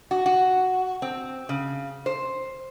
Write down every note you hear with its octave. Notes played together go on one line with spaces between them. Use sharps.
F#4
F#4
C4
C#3
C5